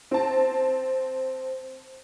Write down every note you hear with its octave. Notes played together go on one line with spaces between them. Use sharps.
C4 A5